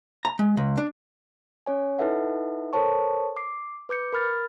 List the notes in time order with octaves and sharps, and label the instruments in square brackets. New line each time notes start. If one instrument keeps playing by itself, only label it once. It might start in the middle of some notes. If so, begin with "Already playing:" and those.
[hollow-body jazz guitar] A#5
G#3
C#2
D4
[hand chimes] C#4 C#5 G#5
D#4 E4 A4 B4 E5 F#5
A4 A#4 C5 C#5 A5 C#6
D6 C7
B4 D6 G6 C#7
A#4 B5 F6 A6